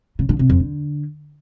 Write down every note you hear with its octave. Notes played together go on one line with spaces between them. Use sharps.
C#3
D3
C3
F2
D3